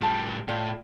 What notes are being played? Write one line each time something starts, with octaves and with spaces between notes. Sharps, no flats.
A2 G3 F4 A5
A2 F4 D5 G5